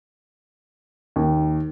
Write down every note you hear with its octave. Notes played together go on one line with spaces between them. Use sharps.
D#2